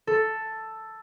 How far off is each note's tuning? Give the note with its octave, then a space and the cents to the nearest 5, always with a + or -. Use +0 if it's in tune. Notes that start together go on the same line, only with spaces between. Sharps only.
A4 +5